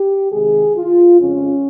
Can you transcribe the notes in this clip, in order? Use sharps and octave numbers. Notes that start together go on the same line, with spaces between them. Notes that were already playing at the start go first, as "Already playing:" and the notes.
Already playing: G4
C3 D#3 G#3 G#4
F4
F2 C#3 G#3 C#4